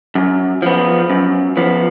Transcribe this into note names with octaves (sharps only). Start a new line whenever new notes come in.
F#2
F3 B3
F#2
F3 B3